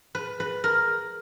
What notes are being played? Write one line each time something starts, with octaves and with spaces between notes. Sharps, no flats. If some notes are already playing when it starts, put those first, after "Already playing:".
B4
B4
A#4